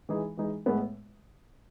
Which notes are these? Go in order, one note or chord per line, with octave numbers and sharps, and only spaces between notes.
E3 G#3 D#4 G#4
E3 G#3 D#4 G#4
A2 G#3 B3